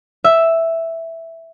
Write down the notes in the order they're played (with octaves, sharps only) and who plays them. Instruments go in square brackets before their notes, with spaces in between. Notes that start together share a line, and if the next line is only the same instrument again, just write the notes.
[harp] E5